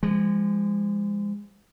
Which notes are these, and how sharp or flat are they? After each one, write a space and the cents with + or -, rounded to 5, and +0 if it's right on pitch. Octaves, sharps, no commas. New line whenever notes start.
F3 -30 G#3 -25